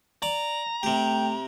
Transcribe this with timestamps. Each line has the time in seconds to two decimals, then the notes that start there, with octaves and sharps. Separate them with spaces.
0.23 D5 A#5
0.83 C3 A3 G4 G5